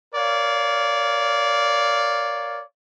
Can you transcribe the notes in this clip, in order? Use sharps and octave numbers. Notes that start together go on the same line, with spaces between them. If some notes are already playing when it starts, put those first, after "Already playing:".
A#4 C#5 D5 F5